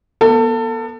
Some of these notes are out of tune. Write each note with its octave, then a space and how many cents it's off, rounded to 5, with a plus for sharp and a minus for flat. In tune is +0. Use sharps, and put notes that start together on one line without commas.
B3 -30 A4 +25